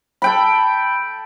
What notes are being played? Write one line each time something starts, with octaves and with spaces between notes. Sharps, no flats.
A4 G5 B5